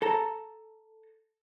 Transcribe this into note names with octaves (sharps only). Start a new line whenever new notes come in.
A4 A5 A#5